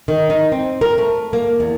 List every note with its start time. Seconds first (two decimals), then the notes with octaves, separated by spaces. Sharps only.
0.08 D#3
0.30 D#4
0.52 C4
0.81 A#4
0.98 A3
1.33 A#3
1.60 E2